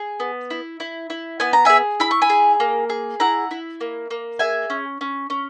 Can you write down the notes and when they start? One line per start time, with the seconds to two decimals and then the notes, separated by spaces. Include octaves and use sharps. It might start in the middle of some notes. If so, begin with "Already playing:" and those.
Already playing: G#4
0.20 B3
0.50 E4
0.80 E4
1.10 E4
1.40 B3 G#5
1.53 A#5
1.65 G#4 E5 G#5
2.00 E4 B5
2.11 C#6
2.22 G#5 B5
2.30 G#4
2.60 A#3
2.90 G#4
3.20 E4 F#5 A#5
3.51 E4
3.81 A#3
4.11 A#3
4.39 G#4 E5 G#5
4.70 C#4
5.01 C#4
5.30 C#4